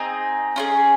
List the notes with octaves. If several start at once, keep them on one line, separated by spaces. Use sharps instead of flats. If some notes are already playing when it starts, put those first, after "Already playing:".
Already playing: C4 D#4 G#4 D#5
C#4 F4 G#4